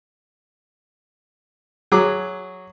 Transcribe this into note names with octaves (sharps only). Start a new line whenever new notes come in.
F#3 G#4 D6